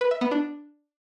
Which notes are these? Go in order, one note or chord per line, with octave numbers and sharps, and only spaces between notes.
B4
E5
B3
D4